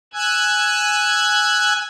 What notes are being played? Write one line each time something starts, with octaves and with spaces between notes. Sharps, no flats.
G#5 E6 F#6 G#6